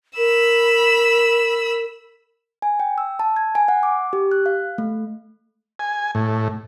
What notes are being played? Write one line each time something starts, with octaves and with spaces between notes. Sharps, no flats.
A#4 B5 E6
G#5
G5
E6
A5
G#6
G#5
F#5
D6
G4
F#6
F5
A3
G#5
A2